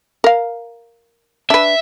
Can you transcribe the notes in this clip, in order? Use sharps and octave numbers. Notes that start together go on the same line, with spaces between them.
A#4 F5
D4 B4 E5